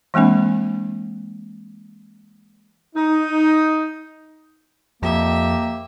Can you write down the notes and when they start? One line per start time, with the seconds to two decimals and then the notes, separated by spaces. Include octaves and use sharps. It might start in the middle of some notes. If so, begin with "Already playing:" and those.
0.14 E3 G#3 A#3 C4 D4
2.96 D#4
5.03 F2 A#3 G4 E5